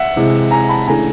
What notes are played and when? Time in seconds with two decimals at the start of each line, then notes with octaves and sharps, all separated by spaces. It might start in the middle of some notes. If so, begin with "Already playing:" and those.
Already playing: E5 F#5
0.16 C3 E3 G#3
0.51 G#5 A#5
0.69 A5 B5
0.87 C#3 E3 A3 D4 G#5 A#5